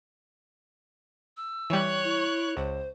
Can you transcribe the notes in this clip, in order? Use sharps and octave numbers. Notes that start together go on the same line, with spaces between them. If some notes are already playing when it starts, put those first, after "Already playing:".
E6
E3 G3 C#5 F#6
E4
C#2 C5